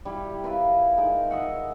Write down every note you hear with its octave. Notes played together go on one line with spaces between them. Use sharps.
G3 E4 G4
E4 F4 A#4 B4
G#3 D#4 A#4
D#5 E5 F#5